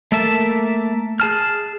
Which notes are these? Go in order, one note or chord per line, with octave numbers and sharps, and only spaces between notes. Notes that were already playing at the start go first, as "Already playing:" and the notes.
A3 A#3 A4 E5 A5
G#4 A5 F6